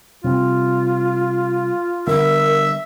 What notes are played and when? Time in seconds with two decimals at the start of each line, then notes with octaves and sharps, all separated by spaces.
0.24 C3 G3 C4 F4
2.07 D3 G3 B3 A#4 E5